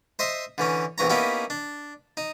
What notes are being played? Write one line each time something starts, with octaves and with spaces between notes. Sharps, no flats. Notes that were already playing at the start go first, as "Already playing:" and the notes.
C5 D#5 E5 C6
D3 E3 C#4
A#1 E2 E3 C#5 A#5
A#3 B3 C#4 D#4 E4 G4
D4
D#4